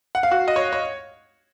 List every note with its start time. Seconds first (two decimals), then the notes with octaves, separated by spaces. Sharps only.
0.15 F#5
0.23 F5
0.31 F#4
0.48 D#5
0.56 C#5
0.73 C#5